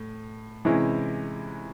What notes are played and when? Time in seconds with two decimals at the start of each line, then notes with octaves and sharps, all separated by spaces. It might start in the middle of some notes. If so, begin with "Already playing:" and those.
Already playing: A2
0.65 C3 E3 G#3 C#4 E4